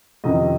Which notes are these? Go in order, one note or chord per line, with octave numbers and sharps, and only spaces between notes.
F2 C3 D#3 D#5